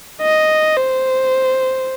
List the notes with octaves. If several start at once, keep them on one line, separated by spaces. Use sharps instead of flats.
D#5
C5